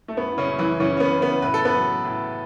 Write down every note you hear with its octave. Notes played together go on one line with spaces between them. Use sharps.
A3
F#2 B3
E4
C#3 C#4
F#2
E3 E4
C#3 E3 C#4
C#4
B3
C#3
B3
A2 B4
A4
B3 B4
F#3
A2